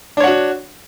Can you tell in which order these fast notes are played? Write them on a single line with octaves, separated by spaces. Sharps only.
D4 C#5 F#5 F#4